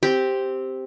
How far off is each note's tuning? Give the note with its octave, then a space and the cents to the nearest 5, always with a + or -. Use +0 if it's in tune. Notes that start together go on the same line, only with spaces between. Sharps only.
C4 +0 G4 +0